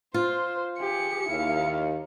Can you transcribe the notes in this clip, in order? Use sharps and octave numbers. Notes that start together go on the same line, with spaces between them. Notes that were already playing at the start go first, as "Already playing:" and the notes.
F4 C5
G4 G#4 C#7
D#2 E4 F5